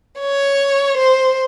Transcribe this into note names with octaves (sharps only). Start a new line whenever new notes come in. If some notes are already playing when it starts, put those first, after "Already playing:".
C#5
C5